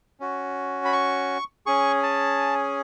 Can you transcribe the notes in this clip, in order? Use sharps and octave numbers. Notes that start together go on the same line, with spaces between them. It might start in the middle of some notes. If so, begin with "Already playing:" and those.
C#4 F#4
B5
C#6
C#4 G#4 C#6
A5